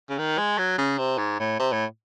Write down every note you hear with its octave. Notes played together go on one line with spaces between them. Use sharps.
C#3
D#3
G#3
F#3
C#3
C3
G#2
A2
C3
A2